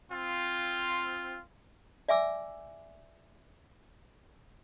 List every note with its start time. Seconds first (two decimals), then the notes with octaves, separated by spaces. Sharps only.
0.11 C4 F4
2.09 D5 E5 G#5 D6 E6